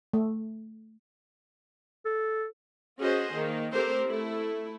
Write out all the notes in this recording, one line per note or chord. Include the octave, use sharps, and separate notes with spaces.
A3
A4
C#4 F#4 G#4 C5 D#5
D#3 A#3
A3 C4 G4 A#4 C5
A3 E4